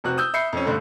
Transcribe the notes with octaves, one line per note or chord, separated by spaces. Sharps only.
F1 C3 F#4 F#6
D#6 E6 G6
E5 B5 G6 C7 C#7
F2 C#4
G2 D3 A3